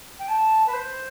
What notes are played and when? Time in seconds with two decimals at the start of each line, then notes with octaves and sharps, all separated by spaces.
0.19 G5
0.28 A5
0.66 B4
0.73 C5